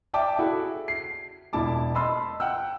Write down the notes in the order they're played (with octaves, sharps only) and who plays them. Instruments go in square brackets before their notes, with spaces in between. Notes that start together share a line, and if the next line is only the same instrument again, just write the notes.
[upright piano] D5 E5 G5 A5 D6
E4 F#4 G#4 A4
C7
E1 E4 A5 D6
D#5 A5 B5 C6 E6
F#5 G5 E6